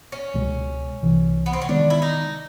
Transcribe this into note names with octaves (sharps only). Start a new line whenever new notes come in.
C#4
C#2 B2 G#3
C2 C3 E3
B3
C4
C#4
C3 D#3 G#3 B3 D4
E4
D#4